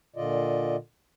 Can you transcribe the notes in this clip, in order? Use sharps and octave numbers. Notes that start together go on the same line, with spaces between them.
A#2 D3 F4 D5 D#5